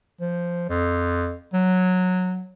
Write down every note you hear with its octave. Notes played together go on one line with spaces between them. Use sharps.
F3
F2
F#3